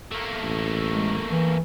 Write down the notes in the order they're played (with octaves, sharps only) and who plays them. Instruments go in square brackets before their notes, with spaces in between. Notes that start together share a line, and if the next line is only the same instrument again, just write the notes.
[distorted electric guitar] A3 A#3
[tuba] A1
[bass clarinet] G#3
E3